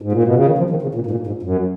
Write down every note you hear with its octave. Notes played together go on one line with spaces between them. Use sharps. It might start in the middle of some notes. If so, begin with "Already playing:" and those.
G#2
A#2
B2
C#3
D#3
F3
D#3
C#3
A#2
G#2
A#2
G#2
F#2